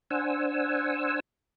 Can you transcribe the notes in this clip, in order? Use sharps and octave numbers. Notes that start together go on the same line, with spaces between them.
D4 C5 F#5 G#5 E6